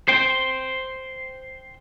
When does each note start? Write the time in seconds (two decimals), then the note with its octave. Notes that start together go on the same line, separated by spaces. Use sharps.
0.08 C5 G5